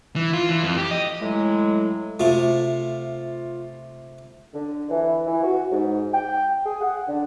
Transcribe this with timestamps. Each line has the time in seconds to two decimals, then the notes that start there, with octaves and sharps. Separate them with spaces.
0.16 E3
0.33 F4
0.49 E3
0.63 F2
0.78 G4
0.91 D#5
1.22 A2 E3 F#3 G#3
2.20 C3 A3 F4
4.54 D3
4.90 E3
5.26 E3
5.44 F#4
5.71 G#2
6.12 G5
6.65 G#4
6.81 F#5
7.08 D3